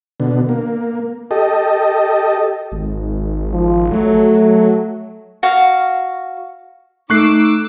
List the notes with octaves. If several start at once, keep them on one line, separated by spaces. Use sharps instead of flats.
B2 D3
A#3
G4 A4 D#5
G#1
F3
F#3 A3
F#4 F5
A3 D#4 C#6 D6 E6 F#6 C7